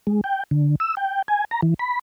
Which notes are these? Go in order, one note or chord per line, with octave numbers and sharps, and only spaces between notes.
G#3
G5
D3
E6
G5
G#5
A#5
E3
B5